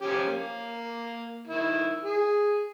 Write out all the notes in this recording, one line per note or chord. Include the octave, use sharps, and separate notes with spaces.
F3 C#4 G4
A#3
D#3 E4
G#4